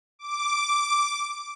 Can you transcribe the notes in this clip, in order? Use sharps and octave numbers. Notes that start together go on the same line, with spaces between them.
D6